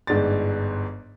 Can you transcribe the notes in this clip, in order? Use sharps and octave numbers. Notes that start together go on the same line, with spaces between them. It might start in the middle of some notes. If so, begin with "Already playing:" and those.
G1 G#2 D4 A6